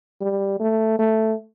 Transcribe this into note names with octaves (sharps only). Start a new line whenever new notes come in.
G3
A3
A3